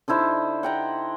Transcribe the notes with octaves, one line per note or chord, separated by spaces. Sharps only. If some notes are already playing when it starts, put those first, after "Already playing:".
D3 D#4 E4 C5
F#5 G5 A#5